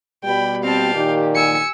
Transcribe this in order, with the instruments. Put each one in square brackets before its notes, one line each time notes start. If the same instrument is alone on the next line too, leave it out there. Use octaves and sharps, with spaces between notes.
[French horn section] B2 G3 [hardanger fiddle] G5 B5
[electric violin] C4 A5 [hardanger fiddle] F5 G5
[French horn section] A#2 D#3 [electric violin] G4
[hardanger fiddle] G#5 [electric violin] E6 C#7